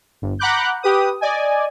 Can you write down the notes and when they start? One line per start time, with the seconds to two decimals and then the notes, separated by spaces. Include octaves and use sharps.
0.22 G1
0.39 F#5 A#5 B5 D6 F#6 G6
0.83 G4 B4 D#6
1.21 D5 D#5 G#5